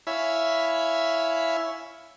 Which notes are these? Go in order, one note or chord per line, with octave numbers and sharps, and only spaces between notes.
E4 C#5 E5 F5 G#5 B5